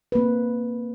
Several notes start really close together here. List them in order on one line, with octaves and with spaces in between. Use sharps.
B4 A#3 C4